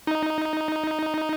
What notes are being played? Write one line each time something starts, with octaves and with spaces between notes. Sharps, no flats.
D#4